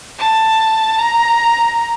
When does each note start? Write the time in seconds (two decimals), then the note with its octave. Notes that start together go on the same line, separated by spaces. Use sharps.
0.19 A5
0.99 A#5